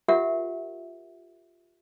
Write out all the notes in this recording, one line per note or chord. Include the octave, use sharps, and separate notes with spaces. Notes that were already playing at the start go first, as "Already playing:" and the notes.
F4 G4 A#4 E5 F#5